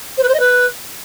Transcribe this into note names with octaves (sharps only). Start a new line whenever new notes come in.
C5
B4
C5
D#5
B4